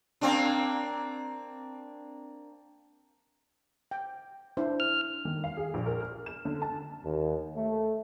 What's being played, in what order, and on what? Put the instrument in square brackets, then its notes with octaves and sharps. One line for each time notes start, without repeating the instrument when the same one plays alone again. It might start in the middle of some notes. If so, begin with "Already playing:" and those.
[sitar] A#3 C4 D4
[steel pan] G5
D4 E4 C5
[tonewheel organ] F6
[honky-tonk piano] D#3
F5
G#4
A#1
A#4
F6
E7
D3
A5
[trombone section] D#2
A3